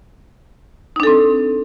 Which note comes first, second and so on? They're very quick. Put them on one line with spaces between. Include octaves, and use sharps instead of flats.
D#4 D4 A4 C4